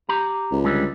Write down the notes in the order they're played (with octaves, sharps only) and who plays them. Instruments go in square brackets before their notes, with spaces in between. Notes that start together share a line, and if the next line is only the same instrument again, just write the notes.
[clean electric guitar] G4 A#5
[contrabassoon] C#2
[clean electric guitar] D3 G3 G#3